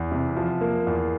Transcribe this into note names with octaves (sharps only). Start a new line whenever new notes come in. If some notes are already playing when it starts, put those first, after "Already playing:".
Already playing: E2
C3
F3
A#3
E2